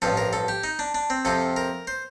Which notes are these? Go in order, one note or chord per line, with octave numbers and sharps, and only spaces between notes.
A1 G2 F3 A4
A#4
A4
G4
D#4
D4
D4
C4
F2 C3 F3 A4
A#4
C5